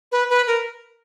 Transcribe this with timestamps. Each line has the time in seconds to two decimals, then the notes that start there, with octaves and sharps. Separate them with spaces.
0.12 B4
0.30 B4
0.47 A#4